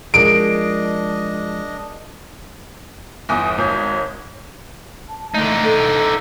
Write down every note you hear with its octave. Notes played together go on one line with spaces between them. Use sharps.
F3 G#3 D4 G#4 A#4 D#5 D7
G1 E2 G#5 D#6
G#1 C#5 G6
A5
D3 A3 D#4
A4